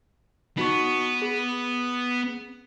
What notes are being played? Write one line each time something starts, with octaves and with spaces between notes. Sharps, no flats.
B3 D#4 F#4 C#6
G#4